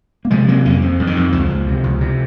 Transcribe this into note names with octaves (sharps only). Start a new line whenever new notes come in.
A#3
C3 F3 G#3
C3 F#3 A#3
F2 A#3 C#4
F2 F3
F2
D#3
F2
C#2 F3
C#2
C3
C#2
C3